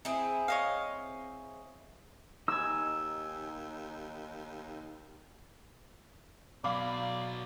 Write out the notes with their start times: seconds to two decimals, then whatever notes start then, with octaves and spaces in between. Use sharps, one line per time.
0.05 C4 E4 G#4
0.48 C#5 D#5 F5
2.48 D#2 D#4 G#5 E6
6.64 B2 F#3 D5 F5 B5 D6